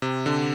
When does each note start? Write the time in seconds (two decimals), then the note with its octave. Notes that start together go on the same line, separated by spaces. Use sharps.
0.02 C3
0.26 D3